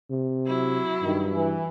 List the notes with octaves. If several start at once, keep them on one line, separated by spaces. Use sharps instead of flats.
C3
F#3 E4
G2 D#3
E3